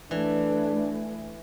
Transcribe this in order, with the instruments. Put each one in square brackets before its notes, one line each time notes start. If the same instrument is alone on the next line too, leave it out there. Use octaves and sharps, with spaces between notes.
[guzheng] E3 [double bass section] A3 [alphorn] D4